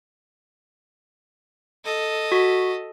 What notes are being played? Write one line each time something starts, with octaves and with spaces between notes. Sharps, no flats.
A4 D#5
F#4 B6